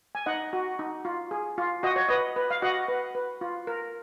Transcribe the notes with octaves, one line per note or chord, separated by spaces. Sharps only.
G#5
D#4 D#5 F#5
F#4
D#4
F4
G#4
F4
F#4 D#5
C#5
B4 D#5
B4
F5
F#4 D#5 F#5
B4
B4
F4
A#4